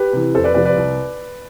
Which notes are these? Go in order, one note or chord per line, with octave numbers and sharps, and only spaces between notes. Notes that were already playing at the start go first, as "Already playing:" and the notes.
Already playing: G4 B4
C3 E3
F2 A4 C5
B4 D5
C3 F3 B4 D5
B4 D5
C2